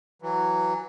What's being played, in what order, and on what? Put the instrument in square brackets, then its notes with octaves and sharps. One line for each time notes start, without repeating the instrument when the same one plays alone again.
[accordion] E3 F#3